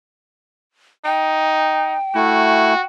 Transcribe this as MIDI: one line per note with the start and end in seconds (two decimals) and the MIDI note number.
1.05 1.96 63
1.05 2.86 79
2.15 2.74 57
2.15 2.74 64
2.15 2.83 66